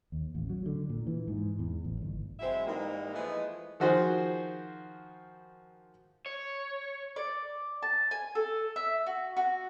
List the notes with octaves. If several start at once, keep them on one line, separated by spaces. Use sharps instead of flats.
D#2
A1
F#3
D3
A#2
E3
G#2
E2
A1
G1
F#3 G#3 C4 E4 E5
G#2 E3 G3 G#3 A#3
E3 F3 G#3 A3 B3 D#5
D#3 F3 F#4 G#4 C5
C#5
D5
A5
G#5
A4
E5
F#4
F#4